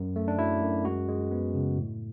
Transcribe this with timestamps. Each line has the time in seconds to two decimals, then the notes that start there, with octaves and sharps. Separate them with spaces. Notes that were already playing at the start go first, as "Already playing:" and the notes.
Already playing: F#2
0.16 A3
0.28 D4
0.39 F#3 E4
0.61 F#2
0.85 G#3 F#4
1.08 G#3
1.31 B3
1.55 C#3
1.78 A2